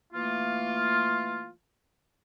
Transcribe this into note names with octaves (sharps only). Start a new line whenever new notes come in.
E3 A3 A#3 F4